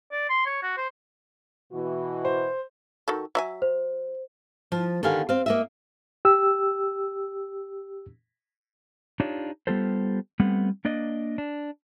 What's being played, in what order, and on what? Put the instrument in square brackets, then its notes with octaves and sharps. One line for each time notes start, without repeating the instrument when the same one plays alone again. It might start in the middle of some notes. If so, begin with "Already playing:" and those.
[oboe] D5
C6
C#5
F#4
C5
[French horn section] B2 E3 F#4
[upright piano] C5
[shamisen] D#3 F#4 A4
F#3 E5 G#5
[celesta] C5
[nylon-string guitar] F3
D3 D#3 B3 G4 F5 G#5
C4 F5
A#3 D#5 E5
[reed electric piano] G4 E6
[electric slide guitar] D4 D#4 F4 G4 C#5
G3 B3 F4 G4 A4 C5
G3 A3 B3 C4 F#5
A#3 D4 D5 D#5
D4